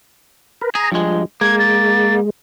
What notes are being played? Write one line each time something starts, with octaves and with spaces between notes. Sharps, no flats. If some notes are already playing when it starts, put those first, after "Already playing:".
A#4 B4
G#4 A#5
G2 F3 G#3
G#3 A#3 G#6
A6